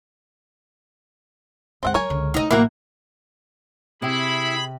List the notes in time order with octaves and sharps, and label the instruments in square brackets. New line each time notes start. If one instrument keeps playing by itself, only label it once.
[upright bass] G1 G#3 [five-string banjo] C4 E5 F#5
[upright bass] F#3 [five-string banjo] A#4 C#5 G#5
[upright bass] C#2 D3
[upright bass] A3 A#3 [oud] D#4 D#5
[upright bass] A1 F#3 [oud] A#3 F#4 [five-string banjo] E4 A#4
[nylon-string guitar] C3 G4 [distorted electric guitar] E4 [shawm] G#4 [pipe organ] B5